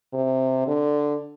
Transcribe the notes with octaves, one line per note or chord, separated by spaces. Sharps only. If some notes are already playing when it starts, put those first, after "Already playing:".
C3
D3